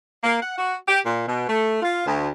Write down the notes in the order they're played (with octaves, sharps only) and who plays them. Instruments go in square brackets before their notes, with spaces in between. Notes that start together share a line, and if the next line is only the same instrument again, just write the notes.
[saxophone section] A#3
F#5
F#4
G4
A#2
B2
A3
F4
D2